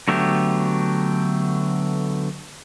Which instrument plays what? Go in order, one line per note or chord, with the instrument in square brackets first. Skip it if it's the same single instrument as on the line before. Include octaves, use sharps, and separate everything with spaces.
[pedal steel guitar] D3 F#3 A3 B3 G4